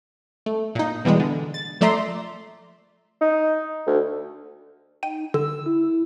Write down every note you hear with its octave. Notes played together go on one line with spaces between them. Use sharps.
A3
A#2 D#4
B2 E3 G3 G#3
D3
A6
F3 A3 D5 E5 A#5 C6
D#4
D2
D#4 G5 D#7
D3 E6
E4